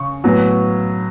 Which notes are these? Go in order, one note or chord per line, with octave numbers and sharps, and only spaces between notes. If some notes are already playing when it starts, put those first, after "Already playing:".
Already playing: C#3 C#6
A2 F#3 B3